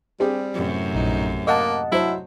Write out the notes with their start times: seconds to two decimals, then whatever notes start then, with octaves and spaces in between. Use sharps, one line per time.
0.20 G3 C4 G4 G#4
0.55 F#2 A2 C3
0.95 A#1 D#4
1.47 A#3 D#5 F#5 A5
1.92 F#3 E4 C5